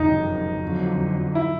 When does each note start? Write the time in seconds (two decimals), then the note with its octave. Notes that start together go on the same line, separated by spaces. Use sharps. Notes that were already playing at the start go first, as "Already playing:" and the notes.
Already playing: F#1 F2 C3 D#3 D#4
0.62 F2 D3 F#3
1.35 E4